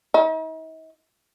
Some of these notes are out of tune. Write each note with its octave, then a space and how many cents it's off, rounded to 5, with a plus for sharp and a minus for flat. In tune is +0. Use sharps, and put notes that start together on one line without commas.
D#4 +45